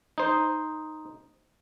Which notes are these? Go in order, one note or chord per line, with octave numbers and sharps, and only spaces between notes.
D#4 C5